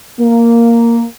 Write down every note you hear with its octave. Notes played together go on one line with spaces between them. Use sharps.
A#3